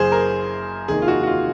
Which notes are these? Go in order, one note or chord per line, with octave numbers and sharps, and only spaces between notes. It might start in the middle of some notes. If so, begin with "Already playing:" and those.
Already playing: F#1 F#2 C#3 G#4 C5
A#4
F1 D#2 D#3 G#4
F4
F#4
F#4
F4